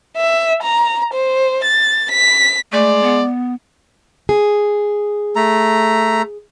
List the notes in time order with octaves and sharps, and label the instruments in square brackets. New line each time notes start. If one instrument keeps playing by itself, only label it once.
[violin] E5
A#5
C5
A6
B6
[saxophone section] G#3 D5 [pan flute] A3
[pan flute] B3
[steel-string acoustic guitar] G#4
[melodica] A3 A#5